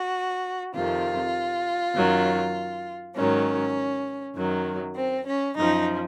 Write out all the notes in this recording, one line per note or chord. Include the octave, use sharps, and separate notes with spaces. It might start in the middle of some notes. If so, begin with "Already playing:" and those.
Already playing: F#4
F2 C3 D#3 F4
F#2 D#3 F#3
G#2 D#3 F#3 C#4
F#2 D#3 F#3
C4
C#4
F#2 F3 D#4